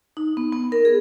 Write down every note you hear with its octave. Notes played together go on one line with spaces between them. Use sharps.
D#4
B3
B3
A#4
G#4